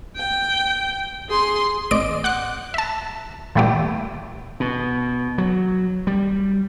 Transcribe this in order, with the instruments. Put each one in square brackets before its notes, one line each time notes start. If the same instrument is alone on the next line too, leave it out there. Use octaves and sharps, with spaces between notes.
[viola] G5
G#4 C6
[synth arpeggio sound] A1 D5 D#5 D7
F#5 D6 F#6
E5 A5
A#2 E3 G3 A3 B3 G4
[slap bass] B2
F#3
G3